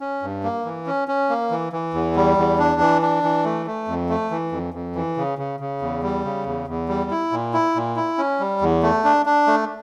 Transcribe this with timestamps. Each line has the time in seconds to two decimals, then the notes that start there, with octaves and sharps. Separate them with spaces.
0.01 C#4
0.22 G2
0.44 A#3
0.65 E3
0.87 C#4
1.08 C#4
1.30 A#3
1.51 E3
1.73 E3
1.94 E2
2.16 G3
2.37 E2
2.59 D4
2.81 E3
3.02 D4
3.24 E3
3.45 A3
3.67 A3
3.88 F2
4.09 A3
4.31 E3
4.52 F2
4.74 F2
4.95 E3
5.17 C#3
5.39 C#3
5.60 C#3
5.82 E2
6.03 G3
6.25 C#3
6.46 E2
6.68 E2
6.89 G3
7.11 E4
7.32 A#2
7.54 E4
7.75 A#2
7.96 E4
8.18 C#4
8.40 G3
8.61 E2
8.83 A3
9.04 D4
9.26 D4
9.47 A3